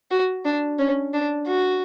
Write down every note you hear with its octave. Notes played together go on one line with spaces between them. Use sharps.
F#4
D4
C#4
D4
F#4